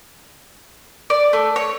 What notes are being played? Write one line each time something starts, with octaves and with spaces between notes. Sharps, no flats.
D5
A3
C#5